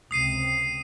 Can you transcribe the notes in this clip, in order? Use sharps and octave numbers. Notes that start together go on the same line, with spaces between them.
C#2 C3 D#6 C7 D#7